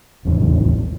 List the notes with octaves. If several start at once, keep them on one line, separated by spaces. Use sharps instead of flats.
D#1 A1 E2